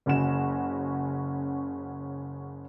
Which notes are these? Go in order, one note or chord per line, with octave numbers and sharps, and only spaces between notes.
F#1 C#3 C#4 F#4 E7